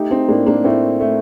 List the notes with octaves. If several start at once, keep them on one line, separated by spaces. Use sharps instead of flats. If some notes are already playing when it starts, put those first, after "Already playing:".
Already playing: A3 D#4 G4
C4 D#4
A2 A#3 D4
A#3 D4
A2 A3 C4
A3